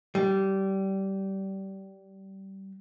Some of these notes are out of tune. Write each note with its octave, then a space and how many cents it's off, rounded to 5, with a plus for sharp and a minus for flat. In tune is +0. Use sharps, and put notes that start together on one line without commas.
G3 -20